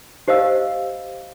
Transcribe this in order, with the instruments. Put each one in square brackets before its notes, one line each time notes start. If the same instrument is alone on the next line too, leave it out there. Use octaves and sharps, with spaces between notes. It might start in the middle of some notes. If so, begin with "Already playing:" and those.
[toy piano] G4 C5 D#5 F5 E6